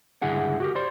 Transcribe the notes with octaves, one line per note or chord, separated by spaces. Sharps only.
C#2 G2 D3 E4 G#4 F#5
F#4 G4 A#4
C5 D5 C6